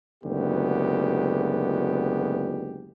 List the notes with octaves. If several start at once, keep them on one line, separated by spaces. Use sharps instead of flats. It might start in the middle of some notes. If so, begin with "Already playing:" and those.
F#1 D2 G#3 B3 G4